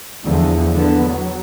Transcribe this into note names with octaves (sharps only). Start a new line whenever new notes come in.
E2 D3 F3
D3 B3
F#3